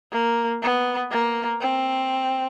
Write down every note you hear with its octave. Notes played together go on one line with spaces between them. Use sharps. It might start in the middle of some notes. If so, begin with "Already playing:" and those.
A#3
B3
A#3
C4